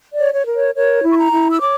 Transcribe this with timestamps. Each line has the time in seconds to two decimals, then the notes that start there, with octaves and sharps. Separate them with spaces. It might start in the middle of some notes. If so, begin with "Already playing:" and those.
0.13 D5
0.19 C#5
0.33 C#5
0.47 A#4
0.54 C#5
0.76 A#4 C#5
1.04 E4
1.11 C#6
1.18 A#5
1.32 E4
1.50 E6
1.59 C#5 D6